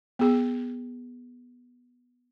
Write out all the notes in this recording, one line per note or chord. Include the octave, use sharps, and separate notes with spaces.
B3 G#4